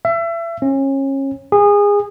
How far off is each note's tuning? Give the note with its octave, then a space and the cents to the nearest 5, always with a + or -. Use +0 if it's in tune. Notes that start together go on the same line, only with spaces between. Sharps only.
E5 +30
C#4 -30
G#4 -25